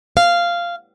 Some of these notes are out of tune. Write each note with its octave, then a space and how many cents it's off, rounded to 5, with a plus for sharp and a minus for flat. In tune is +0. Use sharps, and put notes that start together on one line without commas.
F5 -10